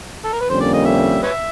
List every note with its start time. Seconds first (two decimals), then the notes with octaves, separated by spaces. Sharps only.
0.24 A4
0.33 A#4
0.41 B4
0.49 F2 D3 G3 A#3 C#4 C5
0.61 D5
0.74 D#5
0.86 E5
1.23 B4 C#5 E5